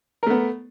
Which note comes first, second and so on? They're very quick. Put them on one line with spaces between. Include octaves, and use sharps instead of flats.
A#4 A3 B3